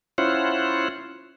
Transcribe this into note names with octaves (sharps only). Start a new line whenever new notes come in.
C#4 E4 F4 C5 F#5